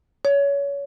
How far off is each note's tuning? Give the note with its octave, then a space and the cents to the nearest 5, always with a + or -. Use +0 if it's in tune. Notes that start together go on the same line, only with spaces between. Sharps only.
C#5 +25